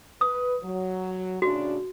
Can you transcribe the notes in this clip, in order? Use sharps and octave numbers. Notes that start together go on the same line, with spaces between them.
B4 D#6
F#3
A2 C#3 D4 F#4